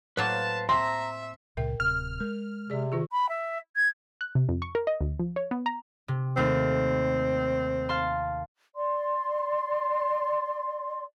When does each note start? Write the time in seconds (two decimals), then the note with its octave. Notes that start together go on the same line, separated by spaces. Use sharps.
0.17 A2 F#3 A#3 B4 C5 F5 A5
0.69 C4 E5 A#5 C6
1.57 C#2 A#2 C#3 A#4 E5 G5
1.80 D1 C3 F6
2.20 G#3 A#4
2.70 C3 G#4 D5
2.92 D#3 F4 G#4
3.11 B5
3.28 E5
3.76 G#6
4.21 F#6
4.35 C3
4.49 F2
4.62 C#6
4.75 A#4
4.87 D#5
5.01 D2
5.20 F3
5.36 C#5
5.51 B3
5.66 A#5
6.08 C3
6.37 D#2 A3 C4
7.89 F5 A5 C6
8.75 D5 C6